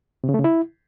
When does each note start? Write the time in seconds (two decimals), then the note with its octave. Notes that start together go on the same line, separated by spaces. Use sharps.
0.24 C3
0.29 C#3
0.34 A3
0.39 C#3
0.44 E4